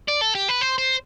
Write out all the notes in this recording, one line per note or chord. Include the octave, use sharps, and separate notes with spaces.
D5
A4
G4
B4
C5
C5